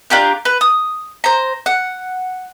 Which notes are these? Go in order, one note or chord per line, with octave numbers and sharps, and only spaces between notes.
D4 F4 G4 A#4
B4
D#6
C5 A#5
F#5